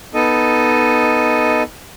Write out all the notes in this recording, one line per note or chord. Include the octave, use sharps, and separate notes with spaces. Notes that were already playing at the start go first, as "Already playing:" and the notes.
B3 D#4 A4 D#5